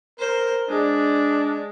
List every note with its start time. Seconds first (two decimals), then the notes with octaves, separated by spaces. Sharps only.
0.19 A#4 C5
0.69 G#3 D4